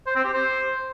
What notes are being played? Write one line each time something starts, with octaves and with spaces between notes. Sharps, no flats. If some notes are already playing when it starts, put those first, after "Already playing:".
C5
C4
G4
C5